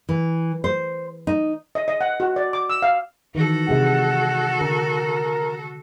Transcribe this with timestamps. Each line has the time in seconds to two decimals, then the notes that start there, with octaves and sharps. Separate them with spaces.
0.09 E3
0.64 C5
1.27 D#4
1.75 D#5
1.88 D#5
2.01 F#5
2.20 F#4
2.36 D5
2.53 D6
2.70 E6
2.82 F5
3.35 D#3 E3 F#4 A4
3.68 C3 G#3 F#5
4.61 D3 A#4